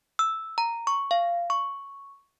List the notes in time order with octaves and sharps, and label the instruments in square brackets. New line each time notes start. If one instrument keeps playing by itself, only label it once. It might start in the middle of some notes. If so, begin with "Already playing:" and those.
[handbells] E6
A#5
C#6
F5
C#6